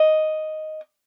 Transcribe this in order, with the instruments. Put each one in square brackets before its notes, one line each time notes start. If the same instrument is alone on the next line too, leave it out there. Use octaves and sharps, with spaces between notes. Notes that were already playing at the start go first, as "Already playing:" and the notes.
Already playing: [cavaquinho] D#5